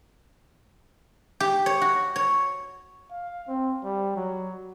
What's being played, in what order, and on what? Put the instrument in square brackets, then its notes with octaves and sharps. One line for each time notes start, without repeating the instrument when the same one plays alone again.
[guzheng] G4
C#5
F#4
C#5
[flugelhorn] F5
C4
G3
F#3